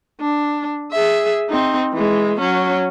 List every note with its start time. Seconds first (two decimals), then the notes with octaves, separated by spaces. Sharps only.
0.21 D4
0.91 G#4 E5
1.49 C4 D#4
1.93 E3 G#3
2.40 F#3 C#4